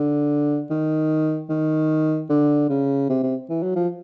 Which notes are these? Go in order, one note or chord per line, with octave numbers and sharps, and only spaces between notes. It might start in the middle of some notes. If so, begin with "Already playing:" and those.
Already playing: D3
D#3
D#3
D3
C#3
C3
C3
E3
F#3
F3